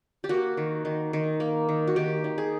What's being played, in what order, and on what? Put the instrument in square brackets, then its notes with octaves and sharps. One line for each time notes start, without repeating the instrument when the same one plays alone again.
[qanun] G4
A#3 F#4
D#3
D#3
D#3
A#3
D#3
F#4
D#3 G4
D#3
G#4